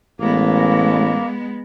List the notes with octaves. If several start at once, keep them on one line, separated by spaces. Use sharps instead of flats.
A1 G#3 A#3 B3